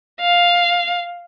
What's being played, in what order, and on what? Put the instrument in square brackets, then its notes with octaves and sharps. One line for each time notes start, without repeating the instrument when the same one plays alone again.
[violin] F5